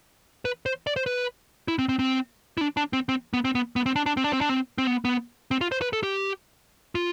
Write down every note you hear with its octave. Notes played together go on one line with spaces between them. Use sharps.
B4
C5
D5
C5
B4
E4
C4
C4
C4
E4
D4
D4
C4
C4
B3
C4
B3
B3
C4
D4
D4
C4
D4
C4
D4
C4
C4
B3
B3
C4
F4
C5
B4
A4
G4
F4